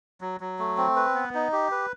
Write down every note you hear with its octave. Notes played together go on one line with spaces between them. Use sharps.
F#3
F#3
A3
C4
B4
B3
D#4
G4
B4